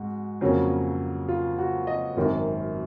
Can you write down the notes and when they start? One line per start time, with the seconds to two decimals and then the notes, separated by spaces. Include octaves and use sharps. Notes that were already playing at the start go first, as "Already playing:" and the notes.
Already playing: G#2 G#3 F#4
0.41 F2 C#3 F#3 A#3 C#4
1.28 F4
1.58 F#4
1.87 D#5
2.17 G#1 F#2 D#3